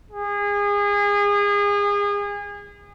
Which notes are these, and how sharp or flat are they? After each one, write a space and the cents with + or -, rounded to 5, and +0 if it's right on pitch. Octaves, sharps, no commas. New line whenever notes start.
G#4 -30